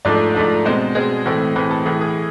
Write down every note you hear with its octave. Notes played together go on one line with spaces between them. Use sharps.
G#2 F3 A3 D4 D5
G#2 F3 A3 D4
B2 G#3 C4 C5
B2 G#3 C4 G#4
A2 E3 A3 C4
A2 E3 A3 C4 B4
A4
A2 E3 A3 G#4
G#4